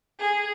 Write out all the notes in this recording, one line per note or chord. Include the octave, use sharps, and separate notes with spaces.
G#4